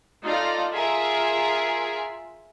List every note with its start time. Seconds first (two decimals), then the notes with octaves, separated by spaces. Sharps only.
0.23 D#4 F4 A4 D5 F5 A#5
0.73 F4 G#4 A#4 E5